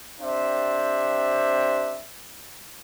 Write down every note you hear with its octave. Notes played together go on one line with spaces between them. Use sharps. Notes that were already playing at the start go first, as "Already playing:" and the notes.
C4 D4 G4 C5 E5